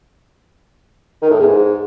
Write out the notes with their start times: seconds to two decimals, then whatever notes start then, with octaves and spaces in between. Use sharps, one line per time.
1.22 D#3
1.30 A2
1.39 E2
1.48 G#2